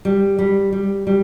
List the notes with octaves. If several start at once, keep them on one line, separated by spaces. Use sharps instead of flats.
G3
G3
G3
G3